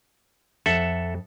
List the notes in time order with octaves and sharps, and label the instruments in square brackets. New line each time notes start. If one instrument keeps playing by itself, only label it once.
[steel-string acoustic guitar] F2 [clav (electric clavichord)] A4 E5 F#5